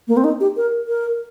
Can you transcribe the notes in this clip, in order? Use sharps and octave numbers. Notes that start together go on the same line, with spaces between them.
A#3
C4
D#4
G4
A#4
A#4